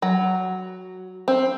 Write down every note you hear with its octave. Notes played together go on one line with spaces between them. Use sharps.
F#3
C4